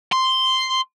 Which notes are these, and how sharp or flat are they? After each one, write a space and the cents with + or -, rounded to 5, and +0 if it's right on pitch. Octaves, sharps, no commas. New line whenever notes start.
C6 -5